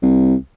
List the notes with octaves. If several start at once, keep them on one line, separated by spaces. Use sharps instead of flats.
C2